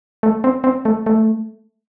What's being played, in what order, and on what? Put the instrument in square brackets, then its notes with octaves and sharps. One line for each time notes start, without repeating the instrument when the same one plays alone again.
[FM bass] A3
C4
C4
A3
A3